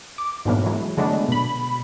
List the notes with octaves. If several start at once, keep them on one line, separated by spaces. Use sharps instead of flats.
D6
G#2 B2 D3 E3 F#3 A#3
E3 F#3 G#3
D3 F#3 G#3 A3 B3 D4
B2 B5